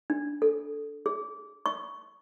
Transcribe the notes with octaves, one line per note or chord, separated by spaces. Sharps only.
D4
A4
G#4
C#6